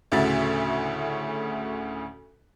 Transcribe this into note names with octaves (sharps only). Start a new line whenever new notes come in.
D2 A2 C#3 F#4 E5 A6